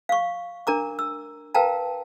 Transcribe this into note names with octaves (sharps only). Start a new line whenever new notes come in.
F5 C#6
D4 A#4 A#5 D6
E6
A#4 B4 F5 G5 A5 A#5